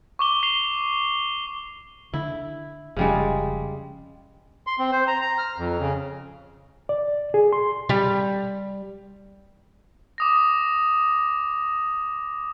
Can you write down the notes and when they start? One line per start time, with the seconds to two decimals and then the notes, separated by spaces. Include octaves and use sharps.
0.19 C#6 D6 G7
0.43 C7 F7 G7
2.14 D3 E4
2.96 F1 C#3 F3 G3 G#3 C#4
4.67 C6
4.79 C4
4.92 C5
5.07 A#5
5.22 A#5
5.38 F6
5.58 F2
5.79 C#3
6.89 D5
7.34 G#4
7.53 C6
7.89 G3
10.18 D6 D#6 A#6